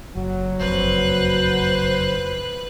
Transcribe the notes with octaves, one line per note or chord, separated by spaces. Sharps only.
F#1 F#3
F#1 F2 B4 C5 F#6